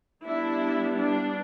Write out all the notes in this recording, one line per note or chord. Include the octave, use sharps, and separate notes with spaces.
G3 B3 D4 E4
D4